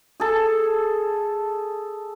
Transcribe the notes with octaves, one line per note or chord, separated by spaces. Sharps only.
G#4 A4